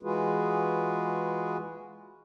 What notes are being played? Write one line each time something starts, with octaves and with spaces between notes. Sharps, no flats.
E3 G#3 F4 F#4 G#4 B4